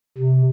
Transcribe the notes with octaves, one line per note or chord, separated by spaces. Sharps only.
C3